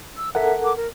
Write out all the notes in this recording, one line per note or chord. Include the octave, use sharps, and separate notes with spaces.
E6
A4 A#4 E5 F#5
D6
A#4